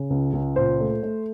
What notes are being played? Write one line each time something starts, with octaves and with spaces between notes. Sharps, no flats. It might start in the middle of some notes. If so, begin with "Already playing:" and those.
Already playing: C#3
C#2
C#2
A#2 C5
A3
A3